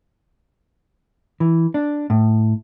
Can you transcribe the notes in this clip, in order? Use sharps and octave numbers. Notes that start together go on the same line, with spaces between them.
E3
D4
A2